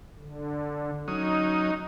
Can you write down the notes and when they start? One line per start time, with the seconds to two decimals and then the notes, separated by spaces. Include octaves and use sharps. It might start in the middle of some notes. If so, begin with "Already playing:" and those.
0.19 D3
1.08 F#3 C#4 D#4 D#6